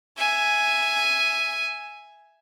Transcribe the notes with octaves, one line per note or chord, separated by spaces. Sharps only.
E5 G#5